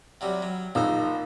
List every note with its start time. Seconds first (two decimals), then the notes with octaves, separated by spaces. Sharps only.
0.21 C3 F#3 G3
0.42 F#3
0.75 A#1 A#3 D#4 C5 E6